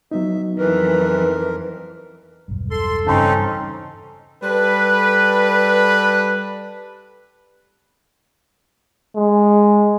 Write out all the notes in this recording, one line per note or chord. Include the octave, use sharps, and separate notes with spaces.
F#3 B3 D#4 E5
F2 E3 A#4 B4
E1 B1 G2
A4 C6
G2 C#3 E3 C4 C#4 D#4 A5 C6
G3 A4 B4
G#3